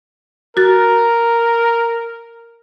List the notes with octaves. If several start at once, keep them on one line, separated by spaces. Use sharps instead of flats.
F#4 A#4 A6